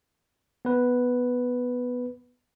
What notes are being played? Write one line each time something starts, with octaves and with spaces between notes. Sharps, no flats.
B3 B4